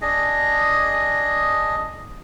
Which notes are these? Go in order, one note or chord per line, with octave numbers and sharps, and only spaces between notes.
D4 G#4 D#5